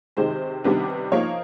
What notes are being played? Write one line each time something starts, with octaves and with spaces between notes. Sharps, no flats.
C3 D#3 G#3 C5
C3 D#3 G3 B3 D4
F3 A#3 D#4 C#5